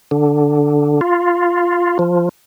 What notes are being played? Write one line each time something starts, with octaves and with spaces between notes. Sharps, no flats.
D3
F4
F3